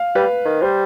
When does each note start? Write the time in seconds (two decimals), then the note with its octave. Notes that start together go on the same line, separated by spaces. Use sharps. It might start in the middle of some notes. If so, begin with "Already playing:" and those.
Already playing: F5
0.15 G3 B4
0.45 D#3
0.62 G3 C5